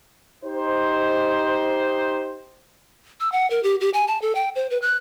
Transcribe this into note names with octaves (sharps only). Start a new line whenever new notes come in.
D#4 G4 C5
E6
F#5
A#4
G4
G4
G#5
A5
A4
G5
C5
B4
F#6